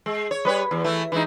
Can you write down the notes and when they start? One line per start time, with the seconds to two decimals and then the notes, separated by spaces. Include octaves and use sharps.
0.06 G#3
0.31 C#5
0.45 G3 B4 C#5
0.71 E2
0.84 E3 A3
1.12 E3 G#3 D#4